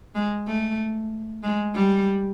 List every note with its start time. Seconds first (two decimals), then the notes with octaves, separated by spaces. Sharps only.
0.15 G#3
0.47 A3
1.43 G#3
1.75 G3